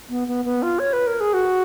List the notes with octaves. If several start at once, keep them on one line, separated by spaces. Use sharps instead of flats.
B3
B3
B3
F4
C#5
B4
A#4
G#4
F#4